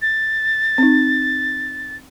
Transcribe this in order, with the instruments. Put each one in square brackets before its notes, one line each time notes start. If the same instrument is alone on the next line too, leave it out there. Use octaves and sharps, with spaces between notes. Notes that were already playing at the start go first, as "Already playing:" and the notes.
[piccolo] A6
[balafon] C4 D#4